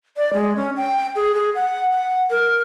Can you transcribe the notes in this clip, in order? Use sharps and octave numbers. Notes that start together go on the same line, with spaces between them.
D5
G#3
C#4
G5
G#4
G#4
F#5
F#5
A#4